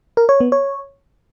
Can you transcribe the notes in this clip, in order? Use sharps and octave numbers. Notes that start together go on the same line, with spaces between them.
A#4
C#5
B3
C#5